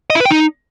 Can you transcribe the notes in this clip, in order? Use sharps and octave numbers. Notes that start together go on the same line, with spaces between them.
D#5
E4
B4
G5
D#4